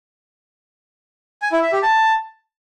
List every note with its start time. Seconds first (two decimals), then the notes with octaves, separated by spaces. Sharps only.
1.42 G#5
1.52 E4
1.62 E5
1.73 G4
1.83 A5